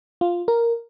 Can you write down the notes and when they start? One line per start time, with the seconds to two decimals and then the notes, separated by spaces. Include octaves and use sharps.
0.21 F4
0.48 A#4